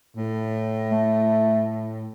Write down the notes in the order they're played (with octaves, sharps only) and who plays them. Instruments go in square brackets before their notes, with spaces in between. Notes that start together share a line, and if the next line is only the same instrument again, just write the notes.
[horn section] A2
[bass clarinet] A3